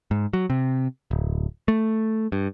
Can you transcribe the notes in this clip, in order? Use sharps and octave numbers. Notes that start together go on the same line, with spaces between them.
G#2
F#3
C3
D1
A3
G2